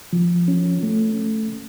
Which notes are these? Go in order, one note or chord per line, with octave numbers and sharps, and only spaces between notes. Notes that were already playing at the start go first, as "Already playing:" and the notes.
F3
C#4
A3